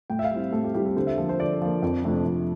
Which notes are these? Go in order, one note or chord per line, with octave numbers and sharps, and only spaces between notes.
A2 G5
E5
F5
G3 C4 E4
A2 A4
G4
G3 C4 E4 G4
A4
D3 C5
E5
F3 A#3 A4
C5
D3 D5
F3 A#3
F2
C3 F3 A3 D4
F2